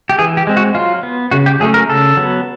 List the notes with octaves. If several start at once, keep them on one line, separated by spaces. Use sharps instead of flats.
G4
E3 G#4
G4
G#3 C4
F#4
F#3 F4
B3
C#3 F#4
G4
F#3 A3 C#4 G#4
A#4
C#3 A4
F#3 B3